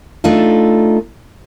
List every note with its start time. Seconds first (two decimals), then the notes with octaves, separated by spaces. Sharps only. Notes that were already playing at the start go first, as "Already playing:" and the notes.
0.24 A3 D4 D#4 F4 A4